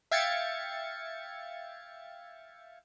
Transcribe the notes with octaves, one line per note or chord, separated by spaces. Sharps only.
E5 F5 G5 G#6 A6 C#7